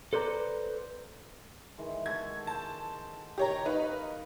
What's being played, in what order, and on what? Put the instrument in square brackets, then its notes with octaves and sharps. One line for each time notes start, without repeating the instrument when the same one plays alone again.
[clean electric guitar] A4 B4 C5 D5 A#5
[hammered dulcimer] D#3 E3 G#3
[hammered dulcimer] F#4 A4 [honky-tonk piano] G#6
[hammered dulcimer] C5 G#5 [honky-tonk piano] A5
[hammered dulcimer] D#3 [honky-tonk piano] G4 C#5 A#5
[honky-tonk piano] D#4 B4 [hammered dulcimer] F5